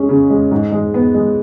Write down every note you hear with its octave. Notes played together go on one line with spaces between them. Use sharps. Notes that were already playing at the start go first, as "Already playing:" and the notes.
Already playing: G#3 C#4
C#3
G#3
G#2
G#3
B3
G#3